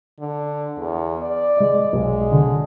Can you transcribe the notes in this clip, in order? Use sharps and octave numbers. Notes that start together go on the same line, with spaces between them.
D3
E2
D5
G#3 D#5
B1 G#3
D3